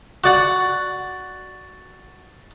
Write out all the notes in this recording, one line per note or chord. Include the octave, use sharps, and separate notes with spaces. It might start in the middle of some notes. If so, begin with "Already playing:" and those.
F#4 D5 F#5